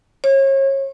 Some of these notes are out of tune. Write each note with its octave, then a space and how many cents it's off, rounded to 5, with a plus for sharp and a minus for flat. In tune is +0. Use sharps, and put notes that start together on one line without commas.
C#5 -35